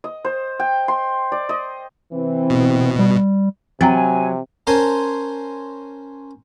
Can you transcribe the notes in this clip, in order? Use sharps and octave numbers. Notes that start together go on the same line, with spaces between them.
D#5
C5
G5
C6
D5
D#5
C3 E3 C4
B2
G3
C3 F#3 C4 G5 G#5 A#5
C#4 A#4 C5 G#5 A5 C6